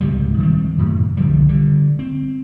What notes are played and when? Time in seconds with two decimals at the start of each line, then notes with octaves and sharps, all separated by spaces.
0.01 C#2 G#2 C3 G3
0.38 D#3 G3 A3 C4
0.78 F#2 A2 C3
1.17 B1 D3 F3 G3
1.49 D3 G3
1.99 C4